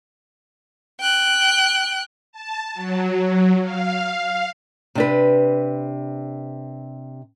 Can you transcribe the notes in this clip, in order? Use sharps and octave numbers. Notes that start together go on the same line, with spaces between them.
G5 F#6
A5
F#3
F5
C3 D4 B4